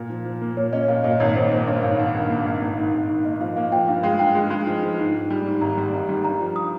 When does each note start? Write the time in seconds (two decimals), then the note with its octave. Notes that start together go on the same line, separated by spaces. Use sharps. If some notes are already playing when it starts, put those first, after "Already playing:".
Already playing: A#2
0.10 F3
0.25 F3
0.41 A#3
0.57 A#2 C#5
0.73 C#4 D#5
0.88 A#2 F5
1.04 A#2 D#5
1.20 G#1 C#5
1.36 G#1 C5
1.51 A#3 C5
1.67 G2 C#5
1.83 G#1 F5
1.99 G2
2.15 G#1
2.30 A#3
2.46 G#1
2.62 G#1
2.78 G#2
2.93 G#1
3.09 G#2
3.25 A#3 D#5
3.40 F3 F5
3.56 A#3 F5
3.72 F3 G5
3.88 G2 F5
4.03 G#3 F5
4.19 G2 G5
4.35 G#3
4.50 G#3
4.67 F3
4.83 F3
4.98 G#2
5.14 G#2
5.30 G3
5.46 G#2
5.61 G#1 A#5
5.77 G3
5.93 G#1
6.09 G3
6.24 G2 A#5
6.40 F3
6.56 D#6